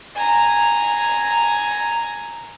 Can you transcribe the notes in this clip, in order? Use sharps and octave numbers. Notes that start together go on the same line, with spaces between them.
G#5 A#5